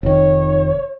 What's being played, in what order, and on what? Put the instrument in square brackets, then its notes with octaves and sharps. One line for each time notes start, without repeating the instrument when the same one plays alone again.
[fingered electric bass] F1 D#3 [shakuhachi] C#5